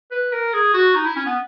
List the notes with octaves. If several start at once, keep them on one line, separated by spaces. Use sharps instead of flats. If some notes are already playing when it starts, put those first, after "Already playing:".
B4
A#4
G#4
F#4
D#4
E4
C#4
B3